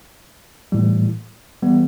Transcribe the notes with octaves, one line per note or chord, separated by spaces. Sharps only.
A2 E3 G3
E3 G3 B3